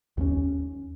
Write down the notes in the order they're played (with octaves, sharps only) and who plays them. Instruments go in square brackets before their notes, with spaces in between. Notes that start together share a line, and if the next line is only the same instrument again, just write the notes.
[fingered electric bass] D#2 A3 C#4